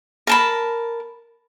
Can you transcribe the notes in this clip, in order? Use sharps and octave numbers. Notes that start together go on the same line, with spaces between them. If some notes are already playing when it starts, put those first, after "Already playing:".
A#4 A5 B5